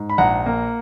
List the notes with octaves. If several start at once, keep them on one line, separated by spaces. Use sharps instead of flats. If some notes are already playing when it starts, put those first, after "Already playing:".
Already playing: G#2
B5
A#1 F#5 A#5
A#3